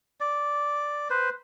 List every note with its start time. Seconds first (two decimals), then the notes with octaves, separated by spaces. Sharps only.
0.20 D5
1.10 B4 C5